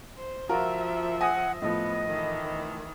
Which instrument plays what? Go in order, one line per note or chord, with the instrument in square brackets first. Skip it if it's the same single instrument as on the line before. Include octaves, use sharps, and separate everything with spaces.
[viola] C5
[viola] F3 E5 [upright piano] F4 F#4 A#4
[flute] F#5 [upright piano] G#5 D#6 A#6
[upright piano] A2 F3 [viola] B3 [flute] D#5
[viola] D#3 E3